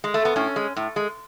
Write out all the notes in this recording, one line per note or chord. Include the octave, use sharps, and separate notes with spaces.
G#3
A3
B3
A2 C#4
G#3
A2
G#3